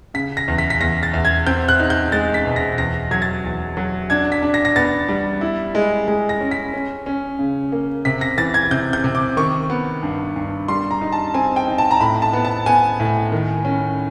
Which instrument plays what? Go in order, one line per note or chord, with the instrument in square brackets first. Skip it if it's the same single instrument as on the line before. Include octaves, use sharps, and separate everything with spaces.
[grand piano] C#3 B6
A#6
E2
B6
B6
E2 A#6
A6
E2
G#6
C4 G6
F#6
D#4
G6
G#3 A6
B6
B2
A#6
E2 A#6
F#3 G#6
A6
E2
F#3
D4 G#6
B6
D4
A#6
A#6
B3 A6
G3
E4
G#3
G#3
A#6
C#4
B6
C#4
C#4
C#3
A#3
C3 B6
A#6
E3 A6
G#6
C3 G6
G6
C3
D6
D#3 C#6
B3
G2
G2
G3 C6
A#5
D#4
A5
C4 G#5
G5
D#4
A5
A#5
A2 B5
A5
B3
A5
B3 G#5
A2
D#3
C#4